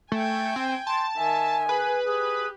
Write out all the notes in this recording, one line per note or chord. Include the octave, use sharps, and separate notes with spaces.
A3 G5 G#5
C4
A5 C6
D#3 E5 G#5
G#4 B4
G4 G#4